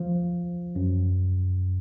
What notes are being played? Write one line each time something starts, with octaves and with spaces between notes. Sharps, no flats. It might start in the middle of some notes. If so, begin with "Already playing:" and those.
Already playing: F3
F#2